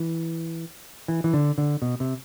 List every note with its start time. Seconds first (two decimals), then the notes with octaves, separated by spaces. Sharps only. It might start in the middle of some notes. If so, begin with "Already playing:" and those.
Already playing: E3
1.08 E3
1.24 E3
1.33 D3
1.58 D3
1.82 B2
2.00 C3